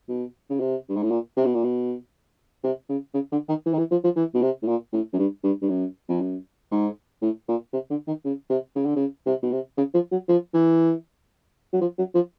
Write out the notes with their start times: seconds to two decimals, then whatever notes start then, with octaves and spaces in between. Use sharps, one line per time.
0.09 B2
0.50 C#3
0.60 C3
0.89 G2
0.96 G#2
1.03 A2
1.11 A#2
1.37 C3
1.46 B2
1.55 A#2
1.64 B2
2.64 C3
2.89 C#3
3.14 C#3
3.32 D3
3.49 D#3
3.66 E3
3.74 D#3
3.78 E3
3.91 F3
4.04 F3
4.16 E3
4.35 B2
4.42 C3
4.63 A2
4.68 A#2
4.93 A2
5.13 F#2
5.19 G2
5.44 G2
5.62 G2
5.69 F#2
6.09 F2
6.21 F#2
6.72 G#2
7.22 A2
7.48 A#2
7.73 C3
7.91 D3
8.07 D#3
8.25 C#3
8.50 C3
8.76 C#3
8.86 D3
8.96 C#3
9.26 C3
9.43 B2
9.52 C3
9.78 C#3
9.94 F3
10.12 F#3
10.29 F3
10.54 E3
11.74 F#3
11.81 F3
11.99 F#3
12.15 F3